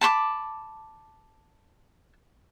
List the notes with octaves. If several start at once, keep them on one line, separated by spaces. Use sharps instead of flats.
A5 B5 C6 D6